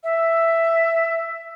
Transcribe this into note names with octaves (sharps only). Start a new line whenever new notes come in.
E5